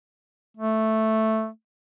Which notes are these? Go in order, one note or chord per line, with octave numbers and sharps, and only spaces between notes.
A3